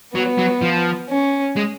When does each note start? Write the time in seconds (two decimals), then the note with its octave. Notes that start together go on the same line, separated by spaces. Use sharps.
0.15 F#3 B3
0.38 F#3
0.63 F3
1.10 C#4
1.56 G#3